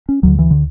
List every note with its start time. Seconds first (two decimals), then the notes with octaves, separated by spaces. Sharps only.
0.09 C#4
0.23 D2 D3 F#3
0.39 E3
0.51 D3